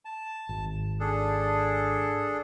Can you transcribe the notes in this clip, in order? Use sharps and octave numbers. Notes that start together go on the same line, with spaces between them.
A5
G#1
D4 G#4 A4